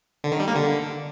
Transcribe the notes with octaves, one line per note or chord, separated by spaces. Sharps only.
D3
D#3
G3
A#3
D3